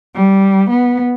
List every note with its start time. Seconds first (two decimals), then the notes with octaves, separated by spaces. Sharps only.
0.15 G3
0.70 B3